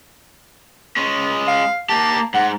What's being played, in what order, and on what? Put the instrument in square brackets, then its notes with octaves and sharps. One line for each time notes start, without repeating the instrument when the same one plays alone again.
[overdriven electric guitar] G#3 C#4
[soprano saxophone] F5
[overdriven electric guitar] A#3 G4 [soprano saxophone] A5
[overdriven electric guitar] G#2 [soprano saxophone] F#5